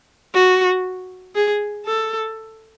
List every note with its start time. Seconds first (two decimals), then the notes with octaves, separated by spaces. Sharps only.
0.34 F#4
1.35 G#4
1.86 A4